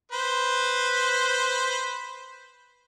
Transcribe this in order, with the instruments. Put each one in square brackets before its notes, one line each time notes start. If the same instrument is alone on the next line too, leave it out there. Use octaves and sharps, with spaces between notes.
[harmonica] B4 C5